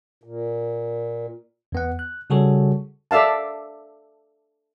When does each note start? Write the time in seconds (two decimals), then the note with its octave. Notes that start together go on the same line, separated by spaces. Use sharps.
0.24 A#2
1.72 E2 B3 F#5
1.99 F#6
2.30 C#3 G3 F#4 G#4 A4 C#5
3.11 A4 D5 E5 F5 A5